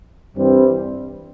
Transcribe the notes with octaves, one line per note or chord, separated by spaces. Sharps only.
G2 E3 G3 C4